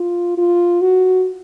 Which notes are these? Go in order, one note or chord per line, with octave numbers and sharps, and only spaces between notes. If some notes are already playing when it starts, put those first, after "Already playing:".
Already playing: F4
F4
F#4